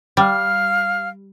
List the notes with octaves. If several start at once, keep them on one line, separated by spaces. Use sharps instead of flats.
G3 F5 F6